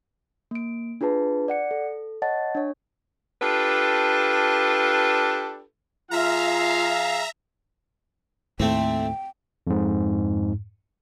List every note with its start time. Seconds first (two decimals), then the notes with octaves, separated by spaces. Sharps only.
0.51 A#3 D7
1.01 D4 F4 G#4 B4 A5
1.48 D5 F#5 C#7
1.71 A4
2.22 C#5 D#5 F#5 A5 A6
2.55 D4 C#5
3.42 D4 F4 G4 A4 B4
6.11 F3 F4 G#4 E5 F5 A#5
8.60 D#2 A2 A3 C4 G5
9.67 F2 G#2